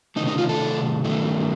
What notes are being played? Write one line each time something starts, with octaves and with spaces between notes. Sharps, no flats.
C3 D#3 A3 D#4
D#4
F4
A4
G2 D#3 A3